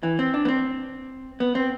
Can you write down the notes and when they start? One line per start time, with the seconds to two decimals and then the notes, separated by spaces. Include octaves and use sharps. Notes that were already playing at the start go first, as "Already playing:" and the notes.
0.03 E3
0.19 C4
0.34 D4
0.45 B3
0.48 C4
1.40 B3
1.55 C4